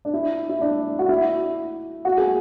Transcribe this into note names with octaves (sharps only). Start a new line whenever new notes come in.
D4
E4
E4
D4
F#4
E4
F#4
G#4